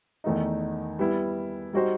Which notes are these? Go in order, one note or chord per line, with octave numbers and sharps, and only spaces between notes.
E2 D#3 A3 D#4
G3 B3 E4
G3 D#4 F#4 C5